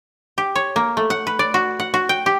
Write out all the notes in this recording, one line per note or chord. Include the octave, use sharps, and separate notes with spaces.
G4
C#5
A#3
A3
F#5
B4
D5
F#4
F#5
F#4
G5
G4